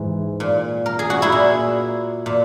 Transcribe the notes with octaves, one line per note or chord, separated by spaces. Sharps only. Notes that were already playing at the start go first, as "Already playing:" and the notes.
Already playing: G#2 E3
A#2
A#4
G#4
F#4
E4 G#4
A#2
A#2